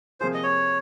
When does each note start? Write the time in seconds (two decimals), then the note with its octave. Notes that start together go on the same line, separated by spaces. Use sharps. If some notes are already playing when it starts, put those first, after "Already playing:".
0.20 C3 F3 A#3 F4 G#4 C5
0.34 D#5
0.43 C#5